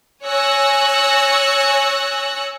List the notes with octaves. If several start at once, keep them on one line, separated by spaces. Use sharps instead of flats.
C#5 G#5 C#6 E6 F#6 A#6